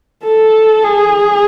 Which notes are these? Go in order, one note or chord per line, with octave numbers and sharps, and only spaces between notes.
A4
G#4